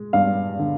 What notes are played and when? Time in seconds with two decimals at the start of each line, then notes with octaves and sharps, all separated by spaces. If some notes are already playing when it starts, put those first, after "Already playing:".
Already playing: G#3
0.13 G2 F5
0.59 D3